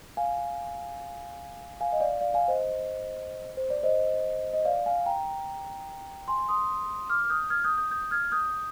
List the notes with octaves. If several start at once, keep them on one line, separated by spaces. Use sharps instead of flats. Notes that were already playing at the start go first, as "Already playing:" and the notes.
F5 G#5
F5 G#5
D#5
D5 F5
D5 F5
F5 G#5
C5 D#5
C5
D5
C5 D#5
D#5
D5 F5
F5 G#5
G5 A#5
G#5 C6
C6 D#6
D6 F6
F6
D#6 G6
F6 G#6
D#6 G6
D#6 G6
D#6 G6
F6 G#6
D#6 G6